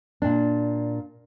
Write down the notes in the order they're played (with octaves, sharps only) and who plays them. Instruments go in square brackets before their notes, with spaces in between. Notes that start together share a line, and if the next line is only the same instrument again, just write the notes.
[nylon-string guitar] A#2 D4